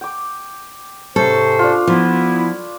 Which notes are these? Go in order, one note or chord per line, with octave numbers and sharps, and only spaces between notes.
G5 D6
G#2 C3 C#4 A4 C5
D4 F4
F3 B3 E4